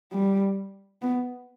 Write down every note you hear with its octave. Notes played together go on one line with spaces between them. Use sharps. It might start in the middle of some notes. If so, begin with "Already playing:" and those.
G3
B3